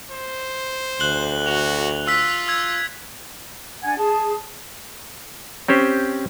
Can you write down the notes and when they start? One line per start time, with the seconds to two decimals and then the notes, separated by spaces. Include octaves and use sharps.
0.11 C5
1.00 D2 F#6 F#7 G7
1.46 F#4 F7
2.07 F4 E6 B6
2.48 E6 G#6
3.83 D4 F#5 G#5 G#6
3.97 G#4 A5
5.68 C4 C#4 G4 C5